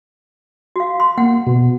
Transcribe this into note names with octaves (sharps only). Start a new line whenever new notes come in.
F#4 F5
C6
A#3 F#5
B2